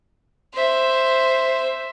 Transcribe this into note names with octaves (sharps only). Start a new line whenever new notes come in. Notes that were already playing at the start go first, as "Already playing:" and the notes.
C5 E5